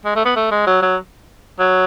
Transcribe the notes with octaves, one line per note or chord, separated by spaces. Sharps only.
G#3
A3
B3
A3
G#3
F#3
F#3
F#3